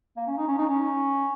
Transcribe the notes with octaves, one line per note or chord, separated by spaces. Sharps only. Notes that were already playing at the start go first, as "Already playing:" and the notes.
A#3
C#4
D#4
C#4
D#4
C#4